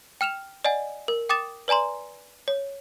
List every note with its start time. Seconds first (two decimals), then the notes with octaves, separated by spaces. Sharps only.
0.21 G5 F6 E7 F7
0.65 D5 D#5 F#5 G#5
1.08 A#4
1.29 G5 D6 D#6 A6 E7
1.68 B4 D5 G#5 A#5 C6
2.48 C#5